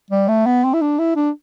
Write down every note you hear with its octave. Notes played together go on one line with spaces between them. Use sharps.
G3
A3
B3
C4
E4
D4
E4
D4